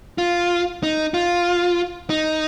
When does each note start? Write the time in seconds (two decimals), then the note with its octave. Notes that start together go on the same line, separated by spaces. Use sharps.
0.18 F4
0.83 D#4
1.14 F4
2.10 D#4